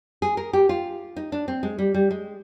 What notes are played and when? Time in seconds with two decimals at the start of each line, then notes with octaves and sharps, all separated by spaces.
0.22 G#4
0.37 A#4
0.53 G4
0.69 F4
1.16 D#4
1.32 D4
1.48 C4
1.63 G#3
1.79 G3
1.94 G3
2.11 G#3